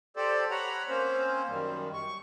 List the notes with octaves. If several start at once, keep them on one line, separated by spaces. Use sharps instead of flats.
G4 A4 C5 D5
C#5 F#5 A#5 B5
A#3 C4 C#4 C5
F#2 D#3 G3
C#6